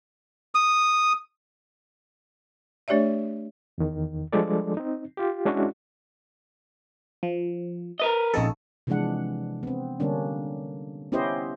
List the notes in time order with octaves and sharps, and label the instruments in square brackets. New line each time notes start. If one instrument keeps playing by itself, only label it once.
[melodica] D#6
[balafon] A3 D4 G4 C#5 D5 E5
[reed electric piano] E2 D#3
F3 G3 G#3 D4 A4 D5
C4 D#4
F4 G4
G#3 C#4 D4 E4 F#4
[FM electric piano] F3
[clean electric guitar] A#4 B4 D#5
[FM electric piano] A#1 D#4 A4 [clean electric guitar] F2 A#2 C#3
[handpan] C3 E3 F3 G#3 D4 F#5
B3 C4
D3 G3 A#3 C#4 D4
B3 C#4 E4 G4 C5 D#5